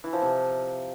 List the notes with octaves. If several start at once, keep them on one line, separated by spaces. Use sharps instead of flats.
E3
F3
C3